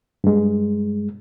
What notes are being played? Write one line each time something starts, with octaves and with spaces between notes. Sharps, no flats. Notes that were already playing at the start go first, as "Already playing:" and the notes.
G2 G#3